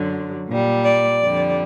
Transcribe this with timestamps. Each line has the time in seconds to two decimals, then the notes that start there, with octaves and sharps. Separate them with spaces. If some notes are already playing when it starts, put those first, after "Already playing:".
Already playing: F#2 D3 F#3
0.47 A#2
0.52 G3
0.85 D5
1.22 F2 D3 G3